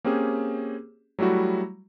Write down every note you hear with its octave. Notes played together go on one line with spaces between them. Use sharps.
A#3 C4 C#4 G4 G#4
F#3 G3 A3 E4 F#4